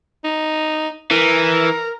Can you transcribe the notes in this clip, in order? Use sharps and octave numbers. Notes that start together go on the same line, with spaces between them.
D#4
E3 A#4